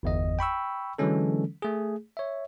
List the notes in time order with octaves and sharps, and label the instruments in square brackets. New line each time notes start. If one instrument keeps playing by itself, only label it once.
[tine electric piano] G1 E2 D#5
G5 B5 C#6 E6
D3 E3 F#3 G#3 C#4 A4
A3 G#4
C#5 E5